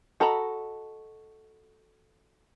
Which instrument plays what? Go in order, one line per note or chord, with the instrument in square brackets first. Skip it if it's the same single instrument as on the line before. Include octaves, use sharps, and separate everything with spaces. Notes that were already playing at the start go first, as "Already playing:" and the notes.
[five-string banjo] F#4 A4 D#5 A#5 B5